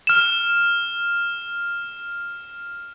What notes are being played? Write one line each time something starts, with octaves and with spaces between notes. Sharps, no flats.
F6 E7